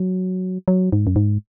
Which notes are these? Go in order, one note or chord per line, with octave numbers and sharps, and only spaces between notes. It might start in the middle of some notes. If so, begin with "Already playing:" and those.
Already playing: F#3
F#3
G#2
F#2
G#2